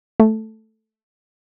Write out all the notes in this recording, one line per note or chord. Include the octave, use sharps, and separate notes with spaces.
A3